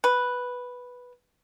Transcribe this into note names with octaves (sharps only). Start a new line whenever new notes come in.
B4